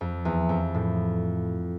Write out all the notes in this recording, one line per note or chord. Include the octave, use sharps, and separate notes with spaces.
F2
E2
F2
A2